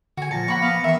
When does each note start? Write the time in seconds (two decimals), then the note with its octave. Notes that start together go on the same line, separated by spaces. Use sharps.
0.17 D3 F#4 G#5
0.31 A#2 F3 A5 A#6 C#7
0.48 A#3 F#5 B5 C#6
0.62 B3 F5 A5
0.84 D#3 E3 B3 E5 C#6